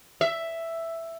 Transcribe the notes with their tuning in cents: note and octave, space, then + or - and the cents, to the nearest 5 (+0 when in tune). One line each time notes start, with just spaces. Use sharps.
E5 +5